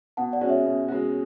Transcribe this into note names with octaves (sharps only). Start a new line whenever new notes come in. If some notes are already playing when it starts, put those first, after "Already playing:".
B2 F#5 A5
D5 F#5
G#3 C#4 F#4
C#5 E5
B2
G#3 C#4 F#4